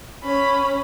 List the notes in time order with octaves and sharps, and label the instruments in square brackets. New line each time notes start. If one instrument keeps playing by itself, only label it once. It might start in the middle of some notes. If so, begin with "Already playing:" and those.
[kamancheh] C#4 [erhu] B5